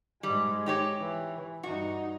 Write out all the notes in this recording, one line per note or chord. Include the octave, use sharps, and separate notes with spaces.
G#2 G3 G#3
D#4 G4 C#5
E3
G2 D#4 F#4